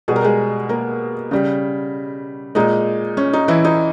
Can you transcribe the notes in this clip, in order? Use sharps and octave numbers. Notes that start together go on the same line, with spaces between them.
B2 G3 G#4
A#4
G#3 G#4
A#3 A#4
C#3 G3
A#2 G#3 D#4
C#4
D#4
E3 E4
D#4